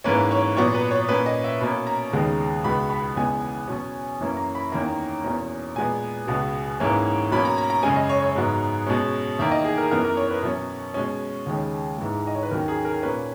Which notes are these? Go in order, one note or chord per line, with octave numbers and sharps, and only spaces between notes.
G#2 E3 A#3 C#4 B4
C#5
A#2 F#3 B3 C#5
B4
C#5
A#2 A#3 C#4 B4
D#5
E5
B2 A#3 C#4 B5
A#5
D#2 C#3 G#3 B3
C#2 B2 G#3 B3 B5
B5
E2 C#3 G#3 B3 G#5
B2 F#3 C#4
F#2 E3 A#3 C#4
A#5
B5
E2 D#3 A#3 C#4 A#5
E2 B2 A#3 C#4
A#2 G#3 B3 G#5
C#2 B2 G#3 B3
G#2 E3 A#3 C#4
B2 F#3 A#3 C#4 B5
A#5
A#5
A#5
F#2 C#3 G#3 C#4 G#5
D#5
C#5
C#5
G#2 F#3 B3
B2 G#3 C#4
E2 D#3 A#3 E5
D#5
G#4
A#4
F#2 E3 B3 A#4
A#4
C#5
B4
B2 F#3 C#4
B2 G#3 C#4
D#2 C#3 G#3 C#4
G#2 E3 G#3
D#5
C#5
B4
D#2 D#3 F#3 C#4 A#4
G#4
A#4
A#2 A#3 C#4 B4